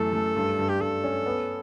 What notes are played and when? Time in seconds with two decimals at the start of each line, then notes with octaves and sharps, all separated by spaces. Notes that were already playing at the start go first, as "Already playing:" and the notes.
Already playing: F#2 E3 A3 A4
0.13 A3
0.36 G2
0.59 G2
0.69 G4
0.81 G2 A4
1.04 C#4
1.26 B3